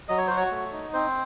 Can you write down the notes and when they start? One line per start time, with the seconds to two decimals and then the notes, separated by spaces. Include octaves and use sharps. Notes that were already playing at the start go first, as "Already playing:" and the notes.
0.09 F#3 D#5
0.18 C#5
0.27 F#4 C5
0.37 C#5
0.51 A3
0.72 D#4
0.93 C4 C5